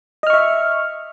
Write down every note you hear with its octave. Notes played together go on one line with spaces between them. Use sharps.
D#5 E5 C#6 F6